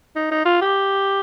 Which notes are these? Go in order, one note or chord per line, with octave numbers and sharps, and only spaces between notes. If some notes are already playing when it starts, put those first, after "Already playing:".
D#4
D#4
F4
G4